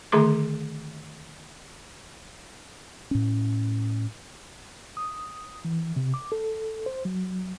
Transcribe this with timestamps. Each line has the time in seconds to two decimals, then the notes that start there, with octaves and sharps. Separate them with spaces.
0.12 D3 D#3 A3 G#4 C6 D6
3.11 A2 C#4
4.97 D#6
5.65 E3
5.96 C3
6.14 D6
6.32 A4
6.86 C5
7.05 F#3